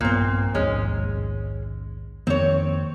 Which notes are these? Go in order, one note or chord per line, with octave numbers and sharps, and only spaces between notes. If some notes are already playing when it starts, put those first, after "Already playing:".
A#1 G2 A#2 B3 C4
A#1 D#2 G#2 G#3 C#4
F2 D#3 A#3 C4 C#5